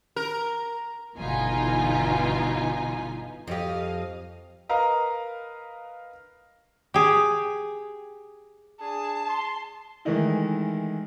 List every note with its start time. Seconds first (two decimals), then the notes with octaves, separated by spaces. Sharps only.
0.16 A#4
1.18 G1 B2 E3 D#4 F4 G#5
3.48 F2 G4 D#5 F5
4.69 A#4 B4 D#5 F5 A#5
6.94 G4 G#4
8.80 D4 G#4 A5
9.29 C6
10.05 D#3 E3 G#3 A3 D#4 E4